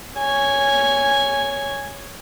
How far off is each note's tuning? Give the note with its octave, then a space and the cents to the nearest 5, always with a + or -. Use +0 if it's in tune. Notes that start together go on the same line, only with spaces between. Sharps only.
C#5 +10 G#5 -5